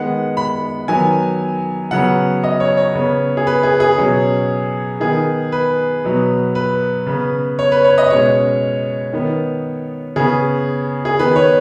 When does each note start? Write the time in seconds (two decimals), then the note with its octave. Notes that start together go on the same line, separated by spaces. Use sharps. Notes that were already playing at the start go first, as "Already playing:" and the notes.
Already playing: D#3 G#3 B3 F#5
0.37 B5
0.88 D#3 F#3 B3 G#5
1.91 C#3 F#3 B3 F#5
2.44 D#5
2.60 C#5
2.77 C#5
2.95 C#3 B3
3.37 G#4
3.47 B4
3.63 G#4
3.80 G#4
3.98 B2 F#3 C#4
5.00 D#3 B3 G#4
5.52 B4
6.04 B2 F#3 B3
6.55 B4
7.06 C#3 B3
7.59 C#5
7.72 B4
7.84 C#5
7.98 D#5
8.10 B2 G#3 C#4 C#5
9.13 D#3 B3
10.16 C#3 B3 G#4
11.05 G#4
11.19 D#3 B3 B4
11.36 C#5